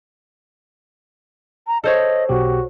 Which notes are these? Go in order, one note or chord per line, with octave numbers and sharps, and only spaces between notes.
A#5
A4 C5 C#5 D#5
B1 B2 F#4 G4